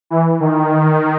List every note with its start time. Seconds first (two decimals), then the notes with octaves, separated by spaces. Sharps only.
0.10 E3
0.40 D#3
0.71 D#3